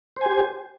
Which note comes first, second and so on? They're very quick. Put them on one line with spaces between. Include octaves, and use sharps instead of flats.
C5 G#5 G4